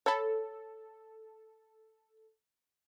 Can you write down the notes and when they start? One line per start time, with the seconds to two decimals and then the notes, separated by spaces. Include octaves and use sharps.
0.06 A4 C#5 B5